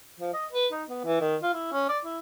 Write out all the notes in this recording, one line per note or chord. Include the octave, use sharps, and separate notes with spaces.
F3
D#5
B4
D#4
B3
E3
D#3
F4
E4
C#4
D5
E4